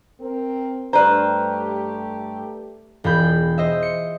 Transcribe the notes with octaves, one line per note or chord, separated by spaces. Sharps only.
C4 A#4
G2 A3 G4 B4 C5 D5 A#5
E1 F4 G#4 B5 G6
C5 D#5 E5
C#7